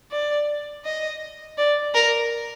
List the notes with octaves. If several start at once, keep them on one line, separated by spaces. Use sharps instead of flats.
D5
D#5
D5
A#4